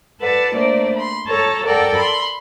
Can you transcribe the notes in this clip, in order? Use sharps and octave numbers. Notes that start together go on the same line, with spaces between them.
A4 B4 D5 F#5 A5
A3 A#3 D4 C5 D5
B5 C6
A4 C#5 A5 A#5
A4 A#4 D5 F#5 G5
B5 C6